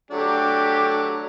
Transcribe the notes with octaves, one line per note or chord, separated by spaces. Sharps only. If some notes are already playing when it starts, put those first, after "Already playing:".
F#3 A3 D4 G4